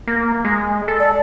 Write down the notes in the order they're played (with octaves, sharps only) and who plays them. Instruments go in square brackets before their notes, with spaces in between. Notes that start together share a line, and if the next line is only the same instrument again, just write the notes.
[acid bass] A#3
G#3
A4
[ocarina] D5